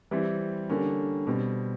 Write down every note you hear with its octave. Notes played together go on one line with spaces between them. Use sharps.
E3 G3 C4
D3 G3 A#3 C#4
B2 G3 C4